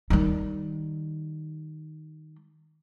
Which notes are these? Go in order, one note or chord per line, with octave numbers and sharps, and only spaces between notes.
D#3 G3